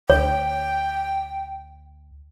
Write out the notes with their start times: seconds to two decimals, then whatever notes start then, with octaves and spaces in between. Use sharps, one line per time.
0.10 D2 C#5 G5